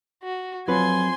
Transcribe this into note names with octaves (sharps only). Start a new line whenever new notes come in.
F#4
F2 F#3 F4 B4 C5 G#5 C6